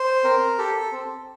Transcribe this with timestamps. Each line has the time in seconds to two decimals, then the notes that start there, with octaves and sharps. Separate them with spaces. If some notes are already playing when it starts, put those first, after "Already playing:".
Already playing: C5
0.24 C4 A#4
0.58 G4 A4
0.92 C4